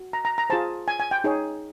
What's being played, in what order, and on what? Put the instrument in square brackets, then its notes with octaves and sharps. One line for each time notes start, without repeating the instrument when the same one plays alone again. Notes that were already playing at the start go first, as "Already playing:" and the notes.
Already playing: [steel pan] F#4
A#5
A#5
A#5
F4 G#4 C5 A5
G#5
G#5
G5
D#4 G#4 C#5